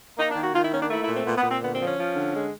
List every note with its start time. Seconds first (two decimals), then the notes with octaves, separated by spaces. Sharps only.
0.18 A#3 D#4
0.30 D4
0.36 D#3
0.42 F#4
0.53 D#3 F4
0.63 E4
0.73 A#3 C#4
0.81 D4
0.90 A3 E4
1.02 E4
1.08 A#2
1.14 C4
1.25 A#2 B3
1.37 B3
1.43 A#2
1.49 C4
1.62 D3 B3
1.73 C4
1.80 F3
1.85 C#4
1.98 F3
2.16 D3
2.34 G#3